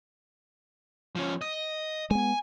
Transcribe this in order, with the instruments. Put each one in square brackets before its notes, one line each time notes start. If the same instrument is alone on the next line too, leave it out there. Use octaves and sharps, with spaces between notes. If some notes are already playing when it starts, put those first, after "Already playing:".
[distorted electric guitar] F3 C#4
D#5
[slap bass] G#3 B3 [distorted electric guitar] G#5